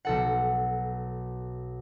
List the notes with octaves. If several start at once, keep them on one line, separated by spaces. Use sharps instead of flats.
B1 A4 F#5